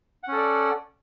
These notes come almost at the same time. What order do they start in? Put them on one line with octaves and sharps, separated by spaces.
F#5 C#4 A4 D5